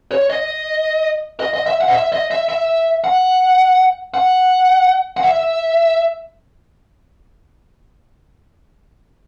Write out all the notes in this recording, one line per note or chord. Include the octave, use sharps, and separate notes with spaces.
C#5
D#5
D#5
D#5
E5
F#5
D#5
E5
D#5
E5
E5
F#5
F#5
F#5
E5